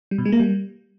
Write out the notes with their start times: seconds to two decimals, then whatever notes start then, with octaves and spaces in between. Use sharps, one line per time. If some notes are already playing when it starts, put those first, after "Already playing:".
0.11 G3
0.18 B2
0.25 G#3
0.32 A#3
0.39 G3